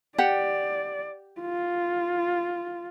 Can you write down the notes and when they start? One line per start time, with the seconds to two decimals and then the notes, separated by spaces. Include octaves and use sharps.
0.18 G4 D5 F#5
1.41 F4